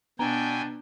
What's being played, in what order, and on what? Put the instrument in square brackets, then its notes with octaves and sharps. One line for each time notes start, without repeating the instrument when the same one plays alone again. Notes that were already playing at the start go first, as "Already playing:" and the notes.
[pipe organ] B2 G5 G#5 [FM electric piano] B3 [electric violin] D4 [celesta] A#5